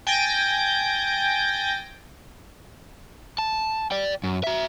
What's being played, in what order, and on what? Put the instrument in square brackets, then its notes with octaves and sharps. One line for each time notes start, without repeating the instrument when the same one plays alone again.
[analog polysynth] G5 G#5 G6 A6 A#6 D7
[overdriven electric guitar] A5
D5 G5
F#2
F#4 E5